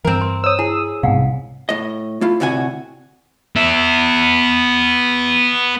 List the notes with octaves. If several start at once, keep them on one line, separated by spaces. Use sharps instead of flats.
G2 E3 C4 A#4
C6
C5 C#5 D#6 E6
E4 G#4
C2 G#2 B2 F5 F#5 G#5
A2 D#5
A3 E4 F4
D2 A2 C3 F#4 F#5 G#5
B3 E5